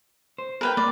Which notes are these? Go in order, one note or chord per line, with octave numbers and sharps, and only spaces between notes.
C5
A#4 B4 G5
A#3 D5